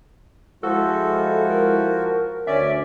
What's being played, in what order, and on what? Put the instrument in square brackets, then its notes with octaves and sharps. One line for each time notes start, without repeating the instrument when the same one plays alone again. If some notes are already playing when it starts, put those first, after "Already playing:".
[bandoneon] F3 F#4 [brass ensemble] G#3 E4 [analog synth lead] A4
[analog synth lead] A#4
[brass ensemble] D2 [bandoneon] C#4 D5 [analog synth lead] E5